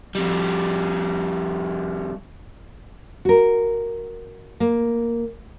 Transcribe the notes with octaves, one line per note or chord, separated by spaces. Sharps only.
F2 G3
F#4 A#4
A#3